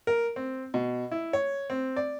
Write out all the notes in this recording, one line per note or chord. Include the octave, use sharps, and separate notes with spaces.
A#4
C4
B2
E4
C#5
C4
D5